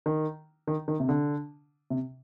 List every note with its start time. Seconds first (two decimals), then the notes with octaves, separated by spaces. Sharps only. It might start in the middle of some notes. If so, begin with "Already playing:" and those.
0.06 D#3
0.67 D#3
0.88 D#3
1.00 C3
1.09 D3
1.90 C3